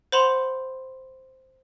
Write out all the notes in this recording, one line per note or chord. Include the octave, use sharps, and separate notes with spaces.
C5 F#5 B5 C6 E7 F7